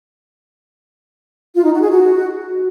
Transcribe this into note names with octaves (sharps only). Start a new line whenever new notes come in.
F4
D#4
F#4
G#4
F#4